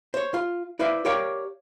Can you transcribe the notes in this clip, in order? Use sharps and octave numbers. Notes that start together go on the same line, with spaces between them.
C5 C#5
F4
E4 B4 C5 D5 E5 F5
G4 A#4 C#5 D5 F5 G5